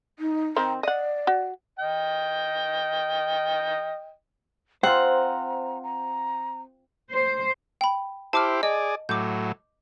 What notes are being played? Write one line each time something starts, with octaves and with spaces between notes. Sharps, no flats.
D#4
D#3 C4 A#5
D5 D#5 F#5
F#4
D#5 G5
C4 F4 C5 F#5 A#5
A#5
C5
G5 B5
E4 G4 C5 A5 D6 F6
G#4 D5 D#5
A2 F#3 D6 G6